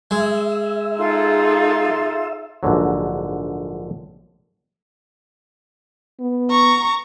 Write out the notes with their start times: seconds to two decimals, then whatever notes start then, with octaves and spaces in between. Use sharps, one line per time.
0.11 G#3 E5
0.98 D#4 F4 G#4 A4 C6
2.63 A#1 G#2 D3 F#3
6.20 B3
6.50 A#5 C#6